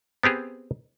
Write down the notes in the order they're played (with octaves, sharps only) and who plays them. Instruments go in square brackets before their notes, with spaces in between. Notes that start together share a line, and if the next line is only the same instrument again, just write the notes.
[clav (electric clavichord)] B3 C4 G4 G#4